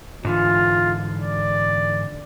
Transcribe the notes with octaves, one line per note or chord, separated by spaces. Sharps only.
G#2 D3 E3 F4
D5